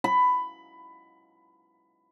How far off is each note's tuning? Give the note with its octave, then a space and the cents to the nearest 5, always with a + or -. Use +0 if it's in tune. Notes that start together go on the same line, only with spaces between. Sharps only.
B5 +15